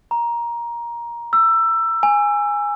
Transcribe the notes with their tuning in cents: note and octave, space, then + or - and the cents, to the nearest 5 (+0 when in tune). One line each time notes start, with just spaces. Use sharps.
A#5 +15
E6 +20
G#5 -10